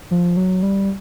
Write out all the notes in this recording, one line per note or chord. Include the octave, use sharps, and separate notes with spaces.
F3
F#3
G3